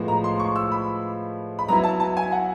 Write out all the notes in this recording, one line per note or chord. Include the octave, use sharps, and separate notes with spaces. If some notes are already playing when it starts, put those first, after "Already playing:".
Already playing: A2 F3 G#3 B3
A#5
C6
C#6
E6
B5
B5
F#3 B3 E4 A#5
A5
A5
G#5
F#5